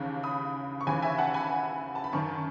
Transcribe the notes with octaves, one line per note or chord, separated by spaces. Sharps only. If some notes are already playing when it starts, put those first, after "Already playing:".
Already playing: D#2 C#3 E3 A5
B5 D#6
C#6
D#2 C#3 E3 G#5 B5
E5 G#5
F#5 A5
G#5 B5
A5
B5
F#2 D#3 A5 C#6